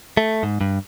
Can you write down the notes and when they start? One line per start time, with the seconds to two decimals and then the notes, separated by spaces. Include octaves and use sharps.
0.17 A3
0.43 G#2
0.61 G2